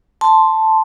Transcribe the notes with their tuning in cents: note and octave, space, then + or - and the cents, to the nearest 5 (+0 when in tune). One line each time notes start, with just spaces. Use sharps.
A5 +0 C6 +0